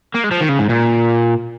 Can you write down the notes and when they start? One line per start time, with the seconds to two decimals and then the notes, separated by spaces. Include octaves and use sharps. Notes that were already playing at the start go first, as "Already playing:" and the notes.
0.14 A#3
0.24 G#3
0.31 F3
0.41 D#3
0.49 C#3
0.59 G#2
0.69 A#2